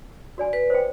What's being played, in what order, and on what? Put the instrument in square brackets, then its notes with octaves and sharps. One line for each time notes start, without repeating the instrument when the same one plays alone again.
[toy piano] F#4 D5 G#5
[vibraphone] B4
[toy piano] C5 G5